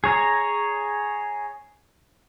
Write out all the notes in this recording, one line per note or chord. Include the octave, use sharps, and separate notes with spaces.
G#4 C#5 A#5